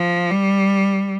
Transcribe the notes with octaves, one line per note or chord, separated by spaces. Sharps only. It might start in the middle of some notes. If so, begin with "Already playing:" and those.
Already playing: F3
G3